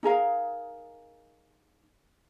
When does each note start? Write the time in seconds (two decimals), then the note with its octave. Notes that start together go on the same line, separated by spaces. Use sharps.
0.03 D#4 G#4 A#4 F5